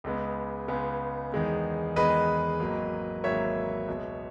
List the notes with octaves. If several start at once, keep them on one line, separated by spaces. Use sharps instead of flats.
C#2 C#3 G#3 B3
C#2 C#3 G#3 B3
E2 D#3 G#3 B3
E2 D#3 G#3 B3 B4 D#5
G#1 G#2 F#3 A#3
G#1 G#2 F#3 A#3 C#5 E5
C#2 B2 G#3